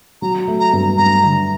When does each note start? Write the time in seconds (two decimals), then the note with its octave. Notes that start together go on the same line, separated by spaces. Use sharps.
0.22 F#3 A#5
0.48 A3
0.60 A#5
0.73 G2
0.98 G2 A#5
1.23 D3